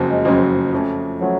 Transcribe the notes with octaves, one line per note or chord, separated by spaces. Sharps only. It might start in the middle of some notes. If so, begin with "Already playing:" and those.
Already playing: F#1 F2 C#3 F#3 C#4
G#3
F#1 F2 C#3 F#3 C#4
F2 F3 A3 C#4
F3 F#3 A3 C#4